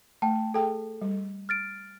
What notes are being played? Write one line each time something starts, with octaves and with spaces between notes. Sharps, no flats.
A3 G5 A5
G#4 A4 G5 A5
G3
F6 A6 D7